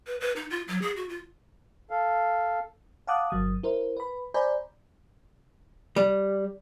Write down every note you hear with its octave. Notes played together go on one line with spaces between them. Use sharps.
B4
B4
D#4
F4
F#3
G#4
F#4
F4
A4 F5
F5 F#5 A5 D6 D#6 F#6
G1 F#3 D#6
E4 A#4 C5
B4 B5
C5 D5 G#5 A#5 B5 G6
G3